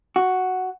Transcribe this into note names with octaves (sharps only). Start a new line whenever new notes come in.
F#4